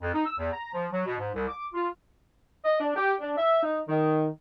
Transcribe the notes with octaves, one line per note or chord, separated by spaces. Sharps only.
F2
D#4
E6
E2
A#5
F3
F#3
B2
G#2
C2
D6
F4
D#5
D4
G4
D4
E5
D#4
D#3